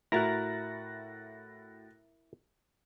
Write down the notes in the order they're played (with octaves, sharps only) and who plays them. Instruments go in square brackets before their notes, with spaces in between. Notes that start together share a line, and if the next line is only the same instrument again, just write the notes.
[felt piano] A2 F#4 [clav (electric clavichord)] E4 A#4 [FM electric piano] F#6 A6 A#6